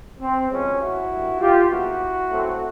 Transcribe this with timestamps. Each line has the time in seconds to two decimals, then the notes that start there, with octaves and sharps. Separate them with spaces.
0.20 C4
0.50 D2 C#3 F3 G#3 B3 C#4
0.79 E4 F#4
1.09 G2 D3 G3
1.39 F4 G4
1.69 D#2 C#3 F#3 B3 E4 F#4
2.29 A2 F#3 A3 C4